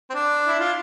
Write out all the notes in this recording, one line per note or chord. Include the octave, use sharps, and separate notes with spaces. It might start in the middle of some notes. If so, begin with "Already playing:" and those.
C4
D4
E4
F4